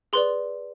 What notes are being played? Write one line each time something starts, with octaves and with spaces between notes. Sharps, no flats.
G#4 B4 D5 C6